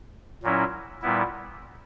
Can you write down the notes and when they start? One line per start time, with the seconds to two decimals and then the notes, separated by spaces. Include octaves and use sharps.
0.43 A#2 F#3 C#4 E4
1.02 A#2 G3 B3 E4